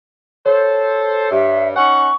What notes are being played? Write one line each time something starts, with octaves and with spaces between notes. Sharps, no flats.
A4 C5 C#5
G2 E5
C#4 D#4 F#5 G#5 C#6